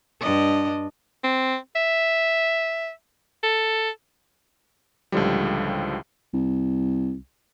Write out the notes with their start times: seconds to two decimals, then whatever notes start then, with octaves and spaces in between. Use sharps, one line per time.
0.21 G2 D4 D#5
1.24 C4
1.75 E5
3.43 A4
5.12 C#2 A2 D3 F3 G3
6.33 C2